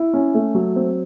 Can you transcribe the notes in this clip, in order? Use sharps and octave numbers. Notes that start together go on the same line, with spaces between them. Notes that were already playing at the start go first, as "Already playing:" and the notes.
Already playing: E4
C#4
A3
F#3
C4